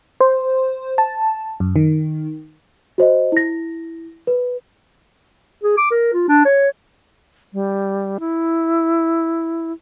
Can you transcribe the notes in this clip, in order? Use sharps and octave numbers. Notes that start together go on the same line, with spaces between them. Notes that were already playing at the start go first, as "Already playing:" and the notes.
C5
A5
F#2
D#3
F#4 C5 D#5
E4 A#6
B4
G#4
D6
A#4
F4
D4
C#5
G3
E4